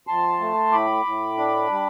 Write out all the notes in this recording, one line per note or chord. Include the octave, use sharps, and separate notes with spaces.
F2 A5 C6
A3
A2 B5 D6
A2
D4
G3